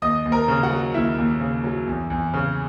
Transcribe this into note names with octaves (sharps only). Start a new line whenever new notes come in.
D#2 D#5 D#6
D#2
A#4 A#5
C#3
F#4 F#5
F#3
D#2 E4 E5
D#2
C#3
F#3
E2
E2
C#3